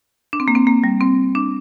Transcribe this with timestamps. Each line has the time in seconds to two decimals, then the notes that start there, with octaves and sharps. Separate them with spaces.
0.33 D4
0.40 C4
0.48 A#3
0.55 C4
0.67 A#3
0.84 G3
1.01 C4
1.35 D4